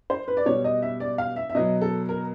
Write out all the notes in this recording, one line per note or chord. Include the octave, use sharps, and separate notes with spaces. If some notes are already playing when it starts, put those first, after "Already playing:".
C5
B4
D5
B2 G3 C#5
D#5
E5
D5
F5
E5
E5
B2 F#3 D#5
A4
A#4